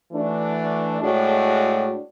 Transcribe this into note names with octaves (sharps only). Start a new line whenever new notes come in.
E3 A3 D4 F#4
A2 G#3 D4 F#4